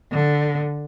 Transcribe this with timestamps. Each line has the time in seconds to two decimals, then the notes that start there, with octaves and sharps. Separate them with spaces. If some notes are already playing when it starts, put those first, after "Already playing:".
0.11 D3